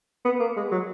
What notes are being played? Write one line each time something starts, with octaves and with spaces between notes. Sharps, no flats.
B3
A#3
G#3
F#3